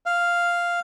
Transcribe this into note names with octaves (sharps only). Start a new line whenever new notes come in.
F5